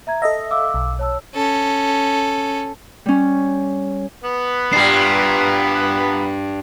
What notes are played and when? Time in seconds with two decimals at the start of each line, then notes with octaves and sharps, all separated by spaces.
0.07 E5 A#5 G#6
0.22 A4 D#5 E5 A#6
0.51 F5 D6 E6
0.74 B1
0.99 C#5 A5 E6
1.35 C#4 A4
3.06 G3 C#4
4.24 B3 B4
4.73 A#2 G3 D4 G4 C7